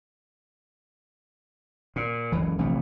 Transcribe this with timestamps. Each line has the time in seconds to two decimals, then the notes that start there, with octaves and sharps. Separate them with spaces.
1.96 A#2
2.32 F#1 C#2 E3
2.58 A#1 C3 E3 A3